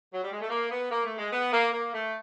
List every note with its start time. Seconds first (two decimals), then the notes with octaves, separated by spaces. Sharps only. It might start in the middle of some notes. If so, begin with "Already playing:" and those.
0.14 F#3
0.23 G3
0.32 G#3
0.41 A3
0.50 A#3
0.71 B3
0.91 A#3
1.05 A3
1.18 G#3
1.32 B3
1.53 A#3
1.73 A#3
1.94 A3